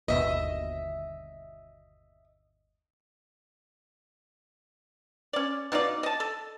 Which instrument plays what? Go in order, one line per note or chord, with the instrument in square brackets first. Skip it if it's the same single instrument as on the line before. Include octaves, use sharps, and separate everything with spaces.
[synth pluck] G1 D#2 B2 [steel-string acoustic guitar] D#5 E5
[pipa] C#4 D5
B2 D#4 F4 D5
D#5 A5
A4